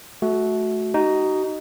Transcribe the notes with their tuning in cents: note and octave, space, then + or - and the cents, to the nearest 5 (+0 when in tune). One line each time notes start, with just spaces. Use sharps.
A3 -25 F#4 +0
D#4 +0 F#4 +40